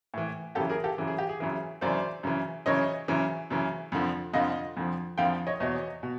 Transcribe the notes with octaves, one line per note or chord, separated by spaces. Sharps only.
A2 E3
F#2 C#3 E3 G4 A4
G#4 A#4
G4 A4
F#2 C#3 E3
G#4
G4
G#4
F#2 C#3 E3
F#2 C#3 E3 C5 D5
F#2 C#3 E3
F#2 C#3 E3 C#5 D#5
F#2 C#3 E3
F#2 C#3 E3
F2 D3 F3
F2 D3 F3 D#5 F5
F2 D3 F3
F2 D3 F3 F5 G5
C#5 D#5
E2 B2 C#5 D#5
B2